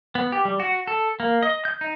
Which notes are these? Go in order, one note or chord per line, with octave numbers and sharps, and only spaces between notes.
B3
G4
G3
F#4
A4
A#3
D#5
G6
D#4